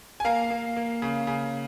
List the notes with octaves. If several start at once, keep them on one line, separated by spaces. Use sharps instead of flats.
G#5
A#3 F5 A#5
A#3
A#3
C#3
C#3